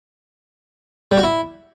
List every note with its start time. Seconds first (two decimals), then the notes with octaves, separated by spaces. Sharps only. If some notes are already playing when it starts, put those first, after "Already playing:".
1.11 G3
1.17 F#4
1.23 E4